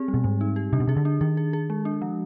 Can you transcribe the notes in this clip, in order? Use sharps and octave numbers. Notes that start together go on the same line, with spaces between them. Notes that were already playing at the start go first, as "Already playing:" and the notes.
Already playing: C4 G4 G#4
G3
B2
G#2 G3
D#4
G4
C3 D4
B2
C3 G#4
D3
D4
D#3 G#4
G#4
G#4
G#3
D4
F3